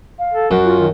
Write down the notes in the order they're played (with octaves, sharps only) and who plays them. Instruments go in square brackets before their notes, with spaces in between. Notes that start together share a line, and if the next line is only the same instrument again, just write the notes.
[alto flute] F5
[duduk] A4
[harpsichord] F#2 [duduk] F#4
[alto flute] F4
[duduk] D#3